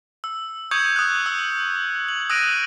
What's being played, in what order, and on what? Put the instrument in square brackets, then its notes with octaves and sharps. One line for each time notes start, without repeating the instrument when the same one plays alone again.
[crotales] E6
C#6 D#6 G6 G#6 C#7 F#7
D#6 F#6
E6
F#7
D#6 E6 F#6 A#6 D7 D#7